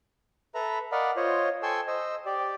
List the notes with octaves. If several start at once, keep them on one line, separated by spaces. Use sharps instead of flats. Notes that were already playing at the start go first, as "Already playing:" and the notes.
A4 B4 E5 A#5 B5
A#4 D5 D#5 F5 F#5 B5
F4 C5 C#5 D#5
A4 G5 G#5 C6 C#6 E6
C5 D#5 E6
G4 D5